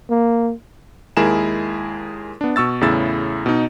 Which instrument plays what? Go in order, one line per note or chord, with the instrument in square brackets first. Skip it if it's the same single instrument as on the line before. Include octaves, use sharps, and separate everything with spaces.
[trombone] A#3
[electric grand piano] D#2 G#3 E4 G#4 A#4 E7
B3 D4
B2 C#6 E6 A6
E2 A2 C#3 E4 E6 A6
B2 D#4